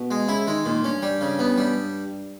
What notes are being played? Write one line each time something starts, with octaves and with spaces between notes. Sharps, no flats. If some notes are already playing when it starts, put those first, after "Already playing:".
Already playing: B2
G#3
C#3 E4
D#3 G#3
A#2 D#3
G2 C#4
G3
C#3
B3
G3